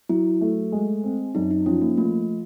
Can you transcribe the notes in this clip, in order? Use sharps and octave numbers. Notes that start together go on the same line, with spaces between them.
F#3 E4
A3
G#3
C4
F#2 D#4
D#4
F3 C#4
A#3
F3 A3